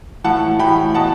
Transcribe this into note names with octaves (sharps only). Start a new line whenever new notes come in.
A2 E3 F#5 A5
A2 E3 G5 B5
B2 F#5 A5